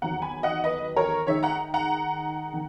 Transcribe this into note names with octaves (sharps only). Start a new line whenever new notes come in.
E2 D#3 F#3 F#5 A#5
G#5 B5
D#5 F#5
B4 D#5
A#4 C#5
D#3 G#3 D#4 C#5 E5
F#5 A#5
F#5 A#5
D#3